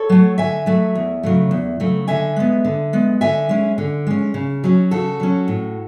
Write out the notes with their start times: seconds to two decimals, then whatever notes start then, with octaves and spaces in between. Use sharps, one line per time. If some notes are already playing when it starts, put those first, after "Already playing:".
Already playing: A4 C#5
0.09 F#3 A3
0.38 D3 E5 G#5
0.66 F#3 A3
0.95 E2
1.23 C#3 F#3 A3
1.51 E2
1.80 C#3 F#3 A3
2.08 D3 E5 G#5
2.36 G#3 B3
2.65 D3
2.93 G#3 B3
3.21 D3 E5 G#5
3.49 G#3 C#4
3.78 D3
4.07 G#3 C#4
4.34 C#3
4.64 F#3 C#4
4.91 C#3 F#4 A4
5.20 F#3 C#4
5.48 A2